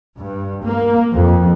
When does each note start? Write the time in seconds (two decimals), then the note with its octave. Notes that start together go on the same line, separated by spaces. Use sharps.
0.18 G2
0.65 A#3
1.12 F2